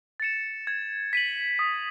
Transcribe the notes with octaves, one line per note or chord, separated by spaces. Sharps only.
A6 C#7 E7
G#6
B6 D#7 F#7
D#6